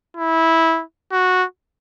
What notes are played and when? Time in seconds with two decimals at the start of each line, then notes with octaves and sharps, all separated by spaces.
0.17 E4
1.12 F#4